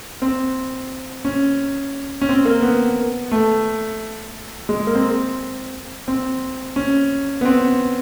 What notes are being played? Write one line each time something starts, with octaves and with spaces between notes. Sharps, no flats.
C4
C#4
C#4
C4
A#3
B3
A3
G#3
A#3
C4
C4
C#4
B3
C4